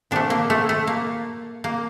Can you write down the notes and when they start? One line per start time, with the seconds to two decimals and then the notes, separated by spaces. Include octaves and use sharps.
0.11 A#2 F3 A3 D4
0.30 A#3
0.50 A3
0.69 A3
0.87 A#3
1.64 A#3